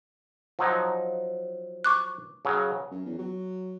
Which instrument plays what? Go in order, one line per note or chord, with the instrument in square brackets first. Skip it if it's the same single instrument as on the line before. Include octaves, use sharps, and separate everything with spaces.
[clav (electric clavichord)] F3 F#3 D#4
[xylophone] C#6 D6 F#6
[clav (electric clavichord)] C#3 F#3
[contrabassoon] F#2
E2
F#3